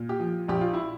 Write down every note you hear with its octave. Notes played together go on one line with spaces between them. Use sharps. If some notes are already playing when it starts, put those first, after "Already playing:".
Already playing: A#2
G4
F3
A#1 G4
F4
E4